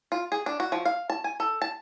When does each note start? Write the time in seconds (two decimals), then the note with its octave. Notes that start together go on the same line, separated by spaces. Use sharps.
0.12 F4
0.32 G#4
0.46 D4
0.60 F#4
0.72 F3
0.85 F5
1.10 A5
1.24 G#5
1.40 A4
1.62 A5